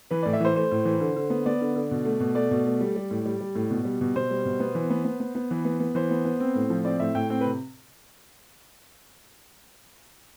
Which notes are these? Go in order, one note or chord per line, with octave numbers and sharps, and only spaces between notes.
E3 B4
A2 D5
E5
E3 C5
A3 C5
A2
E3
D3
D3
B3
B3 D5
D3
D3
B2
A3
B2
A3 D5
B2
A3
G3
G3
A2
G3
G3
A2
B2
G3
B2
B2 C5
G3
B2
B3
E3
B3
B3
B3
B3
E3
B3
B3
E3 C5
B3
B3
C4
A2
F3
C4 D5
A2 E5
A2 G5
C4 G5
B4
C3